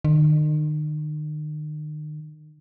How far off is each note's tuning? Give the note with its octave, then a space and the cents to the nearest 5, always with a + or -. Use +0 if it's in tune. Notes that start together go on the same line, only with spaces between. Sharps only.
D#3 -40